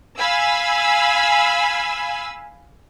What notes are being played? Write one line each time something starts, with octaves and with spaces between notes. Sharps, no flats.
F5 G#5 B5 E6